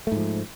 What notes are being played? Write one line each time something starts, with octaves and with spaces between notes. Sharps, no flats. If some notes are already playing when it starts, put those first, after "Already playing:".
G#2 F3 A3